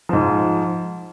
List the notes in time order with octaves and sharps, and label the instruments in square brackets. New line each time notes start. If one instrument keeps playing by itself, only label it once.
[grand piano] G#2 F3